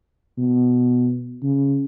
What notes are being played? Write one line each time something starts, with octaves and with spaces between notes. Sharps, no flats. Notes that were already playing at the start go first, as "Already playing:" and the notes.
B2
C#3